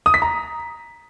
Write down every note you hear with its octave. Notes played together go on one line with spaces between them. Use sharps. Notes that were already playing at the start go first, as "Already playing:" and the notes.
D#6
B6
A#5